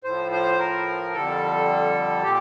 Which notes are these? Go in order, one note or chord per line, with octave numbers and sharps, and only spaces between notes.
A2 F3 C5
C5
A#4
F2 D3 G3 A4
A#2 G4